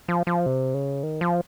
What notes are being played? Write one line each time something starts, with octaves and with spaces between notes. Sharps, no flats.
F3
F3
C3
C#3
D#3
F3